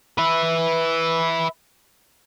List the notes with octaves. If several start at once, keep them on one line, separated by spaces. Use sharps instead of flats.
B4 E5